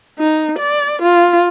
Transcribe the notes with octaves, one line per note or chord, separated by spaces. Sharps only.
D#4
D5
F4